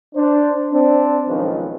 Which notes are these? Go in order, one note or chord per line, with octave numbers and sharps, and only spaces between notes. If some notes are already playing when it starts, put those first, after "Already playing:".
D4 C5
C4 D4
B1 D#3 F3 G#3 C#4 B4